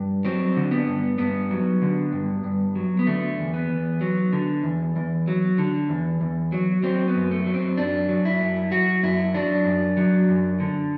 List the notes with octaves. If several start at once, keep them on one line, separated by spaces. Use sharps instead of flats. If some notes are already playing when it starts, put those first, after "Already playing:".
Already playing: G2
F#3 C4
D3
B3
G2
G2 B3
F#3
D3
G2
G2
F#3
B3
D3 A3
E2
B3
E2
F#3
D3
E2
E2
F#3
D3
E2
E2
F#3
F#3 C4
B3
F#2
A3
F#3
C4
F#2 D4
F#3
E4
F#2
F#3 F#4
F#2 E4
F#3 D4
F#2
F#3
F#2
D3